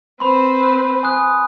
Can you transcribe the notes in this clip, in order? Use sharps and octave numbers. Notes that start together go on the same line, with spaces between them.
C4 B4 C5 B5 C6
G#5 D#6 F#6